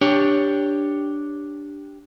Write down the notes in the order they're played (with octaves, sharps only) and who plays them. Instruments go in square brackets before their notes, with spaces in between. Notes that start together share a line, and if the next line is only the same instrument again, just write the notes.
[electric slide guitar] D4 G4 C#5